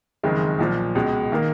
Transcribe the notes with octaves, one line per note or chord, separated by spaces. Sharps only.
F#1 F2 D#3 G#3
B1 A#2 F3
C#2 B2 G#3
D#3 A#3